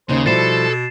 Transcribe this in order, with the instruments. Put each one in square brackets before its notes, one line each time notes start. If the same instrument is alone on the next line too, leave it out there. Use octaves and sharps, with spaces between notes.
[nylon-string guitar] D#2 D#4 [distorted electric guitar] C#3 [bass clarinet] C5
[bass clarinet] B2 [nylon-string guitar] F3 G3 E4 [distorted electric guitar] A4 [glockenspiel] A6 C7 E7